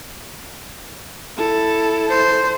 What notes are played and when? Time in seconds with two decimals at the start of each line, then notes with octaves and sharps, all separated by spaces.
1.37 E4 A4
2.09 C5